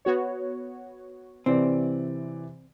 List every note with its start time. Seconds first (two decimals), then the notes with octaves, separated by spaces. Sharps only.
0.05 B3 F#4 C#5
1.46 C3 E3 C4 D5